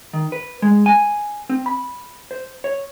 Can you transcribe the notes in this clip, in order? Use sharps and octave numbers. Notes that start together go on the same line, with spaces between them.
D#3
B4
G#3
G#5
C4
B5
C5
C#5